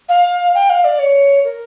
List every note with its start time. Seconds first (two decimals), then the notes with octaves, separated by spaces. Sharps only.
0.08 F5
0.54 G5
0.69 F5
0.84 D5
0.99 C#5
1.44 A#4